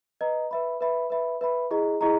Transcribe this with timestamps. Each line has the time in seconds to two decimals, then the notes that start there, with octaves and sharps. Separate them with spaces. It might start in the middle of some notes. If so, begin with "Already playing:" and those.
0.21 B4 D#5 A#5
0.51 B4 E5 B5
0.81 B4 E5 B5
1.10 B4 E5 B5
1.41 B4 E5 B5
1.71 E4 G#4 D#5 A#5
2.01 E4 G#4 D#5 A#5